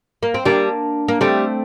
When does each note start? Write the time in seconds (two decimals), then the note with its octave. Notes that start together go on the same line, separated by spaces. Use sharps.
0.23 A#3
0.34 C4
0.45 G3 A#3 D4
1.08 A#3
1.21 G3 A3 C4